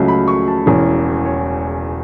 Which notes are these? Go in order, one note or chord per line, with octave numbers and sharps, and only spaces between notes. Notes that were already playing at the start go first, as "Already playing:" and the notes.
Already playing: C#2 C#3 F#3 A3 C#4
B5
C#6
A5
E1 E2 E3 C#4
C#5